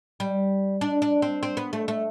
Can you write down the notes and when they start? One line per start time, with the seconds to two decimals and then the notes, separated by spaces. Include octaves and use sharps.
0.20 G3
0.81 D4
1.02 D4
1.22 C4
1.43 C4
1.57 B3
1.73 A3
1.88 A3